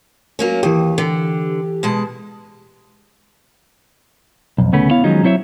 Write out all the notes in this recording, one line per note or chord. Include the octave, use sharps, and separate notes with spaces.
F#3 A#3 C#4
D#2 E3 G4
D3
B2 G#3 A5
B1 F2
D2 C#3 A3 B3 C#4
B3 E4 C#5 F5
D#3 F3 F#3 G#3 C#4 D#4
F#3 C4 E4 C#5 E5